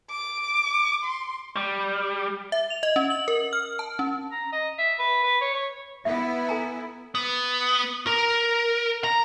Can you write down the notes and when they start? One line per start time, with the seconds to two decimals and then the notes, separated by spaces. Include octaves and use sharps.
0.10 D6
1.03 C6
1.56 G3
2.52 E5
2.70 F7
2.83 D#5
2.96 C#4
3.10 F#7
3.28 A#4
3.53 F6
3.79 A5
3.99 C#4
4.32 A#5
4.53 D#5
4.78 E5
4.99 B4
5.23 B4
5.41 C#5
5.54 C#5
6.05 B3 E4 E5
6.49 A4 G#5 A#5
7.15 B3
8.07 A#4
9.04 A#5